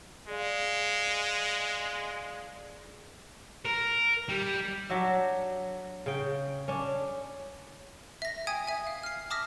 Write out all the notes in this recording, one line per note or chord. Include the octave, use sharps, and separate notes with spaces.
G#3 G#4 D5 F5
A#4
G3
F#3 D4 F#4 E5
C#3 G5
C#4 D4
E5 A#6
G5 G#5 D#6 G#6
E5 G#5
F5
F6 C7
A5 D6 D#6 F6 A#6 B6